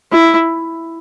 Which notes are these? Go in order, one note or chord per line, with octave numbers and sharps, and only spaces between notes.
E4